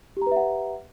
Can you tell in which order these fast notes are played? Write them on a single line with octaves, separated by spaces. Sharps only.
G4 A#5 B4 E5 F#5